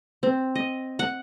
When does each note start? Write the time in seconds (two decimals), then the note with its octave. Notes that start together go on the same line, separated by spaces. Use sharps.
0.23 C4
0.55 D#5
0.99 F#5